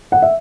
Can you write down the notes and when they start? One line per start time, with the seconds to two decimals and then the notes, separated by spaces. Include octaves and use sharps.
0.12 F#5
0.22 E5